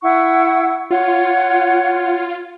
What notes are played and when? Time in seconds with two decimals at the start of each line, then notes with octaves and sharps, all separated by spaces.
0.02 E4 F#5 C#6
0.91 F4 C#5 F#5